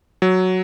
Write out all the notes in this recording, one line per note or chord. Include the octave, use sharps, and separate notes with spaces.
F#3